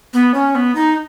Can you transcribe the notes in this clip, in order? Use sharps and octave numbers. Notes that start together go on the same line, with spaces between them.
B3
C#4
B3
D#4